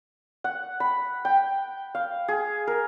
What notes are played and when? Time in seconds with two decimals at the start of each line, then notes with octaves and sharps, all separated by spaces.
0.44 F#5
0.80 B5
1.25 G5
1.95 F5
2.28 G#4
2.67 A#4